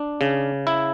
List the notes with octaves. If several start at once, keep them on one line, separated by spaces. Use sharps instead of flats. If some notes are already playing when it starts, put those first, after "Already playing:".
Already playing: D4
C#3
E4